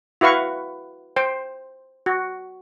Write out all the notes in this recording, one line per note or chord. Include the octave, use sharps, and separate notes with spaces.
E4 F#4 B4 F5 C#6
C5 G5
F#4